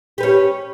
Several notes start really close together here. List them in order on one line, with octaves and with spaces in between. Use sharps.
G4 B4 C#4